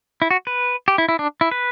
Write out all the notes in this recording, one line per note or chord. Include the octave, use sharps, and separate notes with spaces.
E4
F#4
B4
G4
E4
E4
D4
E4
B4